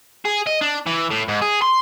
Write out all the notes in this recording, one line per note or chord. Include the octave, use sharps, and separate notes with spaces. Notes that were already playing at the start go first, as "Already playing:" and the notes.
G#4
D#5
D4
E3
A2
G#2
G#4
C6